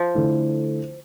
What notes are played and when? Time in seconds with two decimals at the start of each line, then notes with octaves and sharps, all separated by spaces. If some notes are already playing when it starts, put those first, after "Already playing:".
Already playing: F3
0.15 D3 A3 E4